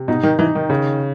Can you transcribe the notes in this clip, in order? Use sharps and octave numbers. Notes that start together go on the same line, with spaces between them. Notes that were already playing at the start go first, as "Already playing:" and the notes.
Already playing: C3
B2 D#4
D#3
E3 D#4
D#3
C#3